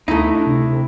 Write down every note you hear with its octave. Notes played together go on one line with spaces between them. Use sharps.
D2 A3 D#4 E4
D4
C3